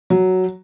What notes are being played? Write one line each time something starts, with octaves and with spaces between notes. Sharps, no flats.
F#3